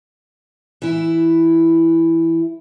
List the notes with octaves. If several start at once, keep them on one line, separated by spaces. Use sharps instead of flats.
E3 E4